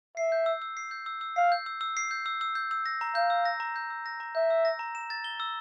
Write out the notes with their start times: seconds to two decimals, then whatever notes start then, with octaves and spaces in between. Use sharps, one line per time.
0.17 E5 C7
0.32 G6
0.46 E6
0.62 E6
0.77 C7
0.91 G6
1.06 E6
1.21 E6
1.36 F5 C7
1.52 G6
1.66 E6
1.81 E6
1.97 C7
2.11 G6
2.26 E6
2.41 E6
2.55 G6
2.71 E6
2.86 A#6
3.01 A#5
3.15 F5 G6
3.30 E6
3.45 A#6
3.60 A#5
3.76 G6
3.90 E6
4.06 A#6
4.20 A#5
4.35 E5 G6
4.51 E6
4.65 A#6
4.79 A#5
4.95 E7
5.10 A6
5.24 G7
5.40 E6